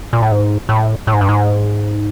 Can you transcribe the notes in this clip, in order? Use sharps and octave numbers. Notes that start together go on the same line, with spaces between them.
A#2
A2
G#2
A2
A2
G#2
G2
G#2